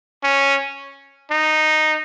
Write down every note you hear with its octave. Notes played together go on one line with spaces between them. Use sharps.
C#4
D#4